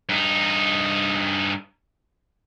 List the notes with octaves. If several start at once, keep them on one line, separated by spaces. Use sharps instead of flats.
G2 D#4